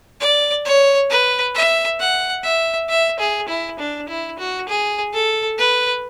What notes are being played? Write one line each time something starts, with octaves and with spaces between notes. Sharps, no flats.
D5
C#5
B4
E5
F#5
E5
E5
G#4
E4
D4
E4
F#4
G#4
A4
B4